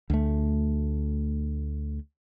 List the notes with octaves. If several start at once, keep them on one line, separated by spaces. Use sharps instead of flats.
D2 A3